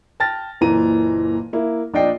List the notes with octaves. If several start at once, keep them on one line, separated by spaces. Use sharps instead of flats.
G5 A5 F6 A6 A#6
F#1 A#2 E3 A#5 D#7
A#3 E4
A#1 D4 D5 D#5 G5 C7